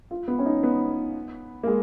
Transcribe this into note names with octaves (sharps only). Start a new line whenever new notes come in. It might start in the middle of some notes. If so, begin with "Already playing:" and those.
F4
B3
C#4
D#4
B3
A#3
G#3